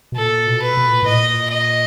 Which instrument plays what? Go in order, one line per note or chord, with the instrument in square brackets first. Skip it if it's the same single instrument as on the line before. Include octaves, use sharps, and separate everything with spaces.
[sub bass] B2
[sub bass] A#2 [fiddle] A4
[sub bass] B2
[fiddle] B4
[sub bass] B2
A#2
[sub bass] A2 [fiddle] D#5
[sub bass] A#2
[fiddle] D#5